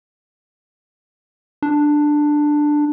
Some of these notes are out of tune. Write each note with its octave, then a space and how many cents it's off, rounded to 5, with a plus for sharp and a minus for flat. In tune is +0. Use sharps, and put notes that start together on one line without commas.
D4 +10